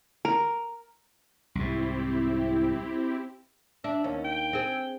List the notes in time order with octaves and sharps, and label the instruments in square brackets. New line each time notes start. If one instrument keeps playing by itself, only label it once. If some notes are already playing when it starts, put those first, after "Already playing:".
[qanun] A#4
[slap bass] C2 G#2 [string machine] C4 E4 G4
[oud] D4 [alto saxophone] E5
[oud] D#2 [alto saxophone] C#4
[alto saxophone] G5
[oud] C4 G#4